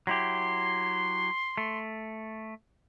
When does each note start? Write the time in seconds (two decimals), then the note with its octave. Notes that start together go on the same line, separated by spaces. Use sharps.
0.07 F#3 E4 G4 C6
1.57 A3